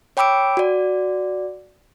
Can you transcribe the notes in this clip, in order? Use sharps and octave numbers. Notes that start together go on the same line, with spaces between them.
C#5 G5 B5 D6 E6 D7
F#4 D5